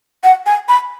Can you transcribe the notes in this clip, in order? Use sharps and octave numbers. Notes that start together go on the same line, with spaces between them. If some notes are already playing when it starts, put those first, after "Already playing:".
F#5
G#5
B5